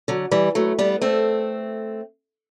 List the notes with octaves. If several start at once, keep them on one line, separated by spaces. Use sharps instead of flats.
D3 F#3
E3 G3
F#3 A3
G3 B3
A3 C4